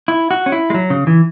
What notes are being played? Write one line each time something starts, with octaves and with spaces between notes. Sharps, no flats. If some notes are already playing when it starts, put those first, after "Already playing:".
E4
F#4
C#4
E4
G#3
F#3
C#3
E3